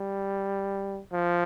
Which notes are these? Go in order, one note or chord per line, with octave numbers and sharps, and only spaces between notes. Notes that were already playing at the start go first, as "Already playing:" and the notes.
Already playing: G3
F3